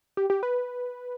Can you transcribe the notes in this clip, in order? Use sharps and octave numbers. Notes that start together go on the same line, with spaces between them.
G4
G4
B4